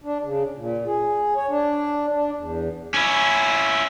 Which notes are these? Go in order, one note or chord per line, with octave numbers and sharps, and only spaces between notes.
D4
C#3
A#2
G#4
C#5
D4
D4
E2
C#4 E4